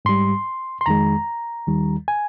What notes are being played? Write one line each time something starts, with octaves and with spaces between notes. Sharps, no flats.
G#2 G3 C6
C6
F2 D#3 G#3 A#5
D#2 D#3 G3
G#5